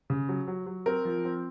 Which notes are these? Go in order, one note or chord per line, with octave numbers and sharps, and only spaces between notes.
C#3
F#3
F#3
F#3
C4 A#4
F3
C4